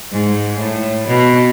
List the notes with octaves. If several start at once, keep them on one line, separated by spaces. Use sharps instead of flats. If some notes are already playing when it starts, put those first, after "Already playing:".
G#2
A2
B2